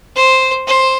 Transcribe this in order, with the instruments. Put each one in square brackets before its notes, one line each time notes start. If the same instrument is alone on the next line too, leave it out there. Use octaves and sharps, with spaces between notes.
[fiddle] C5
C5